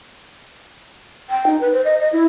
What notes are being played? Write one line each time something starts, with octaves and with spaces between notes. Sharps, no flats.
G5
D#4
B4
C5
D#5
D#5
E4